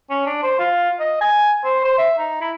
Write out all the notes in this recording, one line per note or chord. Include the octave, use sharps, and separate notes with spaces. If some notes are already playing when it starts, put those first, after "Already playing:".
C#4
D4
C5
F4
D#5
G#5
C5
C5
E5
D#4
E4